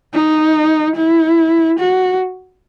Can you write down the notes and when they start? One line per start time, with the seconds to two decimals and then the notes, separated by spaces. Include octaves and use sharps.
0.13 D#4
0.96 E4
1.79 F#4